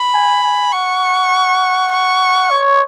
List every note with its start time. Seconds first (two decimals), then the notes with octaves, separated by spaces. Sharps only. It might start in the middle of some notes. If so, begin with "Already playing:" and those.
Already playing: B5
0.14 G#5
0.43 G#5
0.72 F#5 C#6
1.92 C#6
2.51 C#5